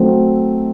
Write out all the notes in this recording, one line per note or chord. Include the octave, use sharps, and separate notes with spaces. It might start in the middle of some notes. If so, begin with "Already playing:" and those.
Already playing: F#3 A3 C4